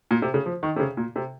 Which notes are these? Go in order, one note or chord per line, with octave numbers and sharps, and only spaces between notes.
A#2
C3
C#3
F3
D#3
C3
C#3
A#2
C3